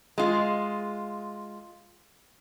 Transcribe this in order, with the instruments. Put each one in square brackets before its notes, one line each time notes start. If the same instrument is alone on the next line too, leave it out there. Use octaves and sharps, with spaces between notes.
[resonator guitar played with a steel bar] G#3 F4